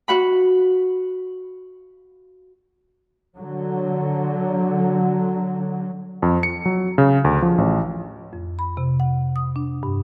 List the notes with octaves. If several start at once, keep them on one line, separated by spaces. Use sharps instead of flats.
F#4 F#5 B5
D3 F#3
F2
C#7
F#3
C#3
D2
F3
A1
F2
B5
C3
F#5
D#6
D4
G2